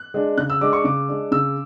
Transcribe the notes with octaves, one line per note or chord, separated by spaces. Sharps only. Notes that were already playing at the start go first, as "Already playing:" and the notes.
Already playing: F#6
G#3 D4
C#3 F#6
E6
G#3 D4 D6
C#6
C#3 D6
G#3 D4
C#3 E6